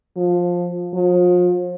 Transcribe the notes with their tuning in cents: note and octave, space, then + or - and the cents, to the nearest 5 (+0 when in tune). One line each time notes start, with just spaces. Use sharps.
F3 +15
F3 +35